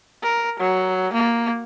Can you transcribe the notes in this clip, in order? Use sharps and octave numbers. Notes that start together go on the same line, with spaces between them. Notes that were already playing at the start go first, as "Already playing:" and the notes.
A#4
F#3
A#3